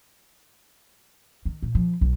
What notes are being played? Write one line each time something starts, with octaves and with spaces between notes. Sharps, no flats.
D#3
A#2
F3
B1